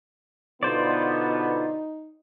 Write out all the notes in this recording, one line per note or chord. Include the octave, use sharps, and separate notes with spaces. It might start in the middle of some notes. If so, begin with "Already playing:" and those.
B2 D3 B3 D#4 F4 C5 D5